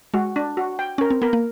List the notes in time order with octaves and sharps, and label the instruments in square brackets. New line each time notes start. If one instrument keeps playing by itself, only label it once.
[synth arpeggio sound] G#3 [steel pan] F#4
[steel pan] D4
F#4
G5
[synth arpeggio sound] C#4 [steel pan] A#4
[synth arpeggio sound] C4
[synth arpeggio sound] B3 [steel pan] A#4
[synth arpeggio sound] A#3